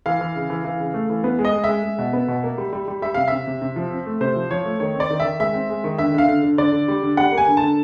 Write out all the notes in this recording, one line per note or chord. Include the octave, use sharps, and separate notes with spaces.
E3 F5
E3
C#3
E3
E3
C#3
A3
E3
B3
G#3
D#5
G#3
E5
G#3
G#3
B2
B3
B2
A#3
G3
G3
G3
G3 E5
C3 F5
C3 E5
C3
C3
F3
C4
A3
C3 C5
F3
F3 C#5
A3
D#3 C#5
C4
D5
D#3
E5
D#3
G#3 E5
C4
G#3
D#3
D3 E5
D3 F5
D3
D3
D3 D5
D3
G3
D3
G3 F#5
A#3
G#5
D3
A5
D3